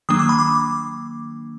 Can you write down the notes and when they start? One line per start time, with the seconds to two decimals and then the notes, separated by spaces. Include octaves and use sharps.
0.09 D#3 F#3 A#3 D4 D#6
0.19 D6
0.29 B5
0.39 D6